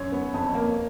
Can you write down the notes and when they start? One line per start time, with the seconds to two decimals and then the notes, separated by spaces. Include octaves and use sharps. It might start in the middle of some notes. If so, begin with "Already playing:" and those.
Already playing: F#2 C#5
0.12 B3
0.34 F2
0.55 A#3